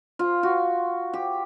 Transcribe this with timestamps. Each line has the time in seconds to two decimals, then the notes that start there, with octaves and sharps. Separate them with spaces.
0.19 F4
0.43 F#4
1.14 G4